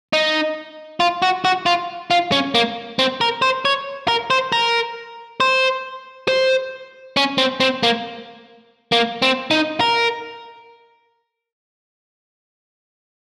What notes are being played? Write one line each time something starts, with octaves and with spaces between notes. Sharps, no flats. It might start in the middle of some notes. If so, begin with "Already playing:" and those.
D#4
F4
F#4
F#4
F4
F4
C#4
A#3
C4
A#4
C5
C#5
A#4
C5
A#4
C5
C5
C#4
C4
C4
A#3
A#3
C4
D#4
A#4